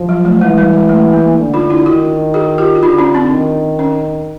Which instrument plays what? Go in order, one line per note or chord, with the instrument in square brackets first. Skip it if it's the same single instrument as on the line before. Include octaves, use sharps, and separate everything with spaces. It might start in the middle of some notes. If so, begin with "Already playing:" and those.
Already playing: [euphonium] F3
[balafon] F#3
A3
[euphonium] E3 [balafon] G#3
[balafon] G3
G#3
A3
A#3
[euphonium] D3
[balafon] D#4 F4
D4 E4
[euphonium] D#3 [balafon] E4 F#4
[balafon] F#4 G#4
F4 G4
F#4
[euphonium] D3 [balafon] D#4 F4
[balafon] C#4 D#4
C4 D4
[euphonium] D#3
[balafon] C#4